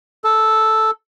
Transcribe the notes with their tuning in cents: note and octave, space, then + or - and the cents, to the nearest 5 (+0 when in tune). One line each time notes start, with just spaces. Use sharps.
A4 -5